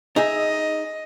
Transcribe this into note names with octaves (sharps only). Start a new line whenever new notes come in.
D#4 G#4 D#5 E5